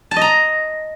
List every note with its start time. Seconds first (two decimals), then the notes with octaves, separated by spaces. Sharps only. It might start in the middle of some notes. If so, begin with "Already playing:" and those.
0.11 A5
0.16 D#5
0.21 A#5